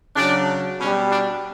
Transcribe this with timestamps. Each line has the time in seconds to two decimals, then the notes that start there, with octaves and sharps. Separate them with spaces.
0.16 C#3 F#3 D4
0.79 B2 G3 C#4
1.10 D4